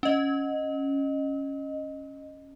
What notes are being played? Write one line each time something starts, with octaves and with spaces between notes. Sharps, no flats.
C#4 D#5